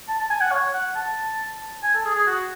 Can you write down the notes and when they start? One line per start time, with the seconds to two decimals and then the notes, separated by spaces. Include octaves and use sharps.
0.08 A5
0.19 A5
0.30 G#5
0.41 F#5
0.51 C#5
0.74 F#5
0.95 A5
1.83 G#5
1.94 A4
2.05 G#4
2.15 G#4
2.27 F#4